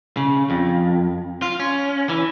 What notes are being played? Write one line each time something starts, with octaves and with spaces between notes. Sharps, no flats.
C#3
F2
F4
C#4
E3